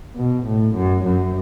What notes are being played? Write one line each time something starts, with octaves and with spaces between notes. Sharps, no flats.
B2
A2
F#2
F#2